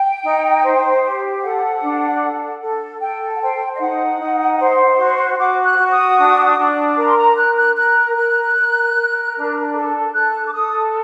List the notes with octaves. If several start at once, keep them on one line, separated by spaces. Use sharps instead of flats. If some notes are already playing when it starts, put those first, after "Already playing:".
Already playing: G5
D#4
C5
G4
A4 F#5
D4
A4
A4
A4 G5
F#5
C5 G5
D#5
D#4 F#5
D#4
C5
F#4
F#4 D6
F#6
F#4
D#6
D4
D4
A#4
C6
A#5
A#4 F#6
F#6
A#4 F#6
A#4 F#6
A#4
A#4
D4
A4
A4 F#6
D6
A4 D#6